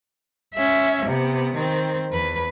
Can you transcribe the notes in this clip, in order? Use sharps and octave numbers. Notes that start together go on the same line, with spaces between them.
C#4 E5
C3 B3
D#3 C4
E2 B4